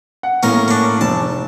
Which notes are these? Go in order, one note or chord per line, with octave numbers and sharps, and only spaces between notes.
F#5
A2 A#3 C#4 A#4
C#4 D4
F1 A5